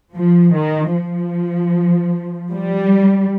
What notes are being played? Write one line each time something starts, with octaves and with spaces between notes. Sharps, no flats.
F3
D#3
F3
G3